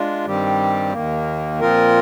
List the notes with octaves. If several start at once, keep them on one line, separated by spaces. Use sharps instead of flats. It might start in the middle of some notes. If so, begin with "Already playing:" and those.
Already playing: G#3 D4 F4
G2 D#3 G3 C4 G4
D#2 D#3 A#3
A#2 F3 C4 F4 A#4